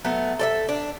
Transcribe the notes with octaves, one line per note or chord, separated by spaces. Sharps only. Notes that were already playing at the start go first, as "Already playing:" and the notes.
F#3 A3 B3
A4 D5 E5
D4